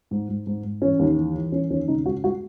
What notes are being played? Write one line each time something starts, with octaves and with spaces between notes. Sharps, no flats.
G#2
G#2
G#2
G#2
E3 C#4
D#2
E3
E3
E3 C#4
D#2 C#4
C#3 D#4
G#3 F#4
G#3 F#4